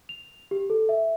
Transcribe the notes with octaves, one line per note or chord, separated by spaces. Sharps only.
F7
G4
A4
E5